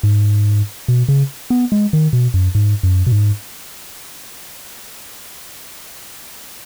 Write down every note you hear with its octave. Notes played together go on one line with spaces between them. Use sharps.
G#2
B2
C#3
B3
G#3
D#3
B2
F#2
G#2
F#2
B2
G#2